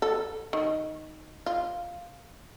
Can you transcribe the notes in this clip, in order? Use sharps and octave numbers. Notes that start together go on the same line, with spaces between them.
A4
D#3
F4